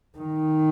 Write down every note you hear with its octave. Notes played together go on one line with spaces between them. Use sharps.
D#3